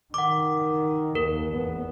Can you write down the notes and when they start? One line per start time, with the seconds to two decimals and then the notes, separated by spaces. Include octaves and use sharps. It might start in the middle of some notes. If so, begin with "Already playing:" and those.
0.14 D#3 F#5 D6
1.15 D#2 A#4
1.53 E2 B3